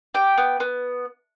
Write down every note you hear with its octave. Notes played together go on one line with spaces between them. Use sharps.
G4 G5
B3
B3